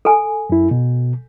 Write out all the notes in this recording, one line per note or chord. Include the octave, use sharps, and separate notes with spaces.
A4 G#5
F#2 E4
B2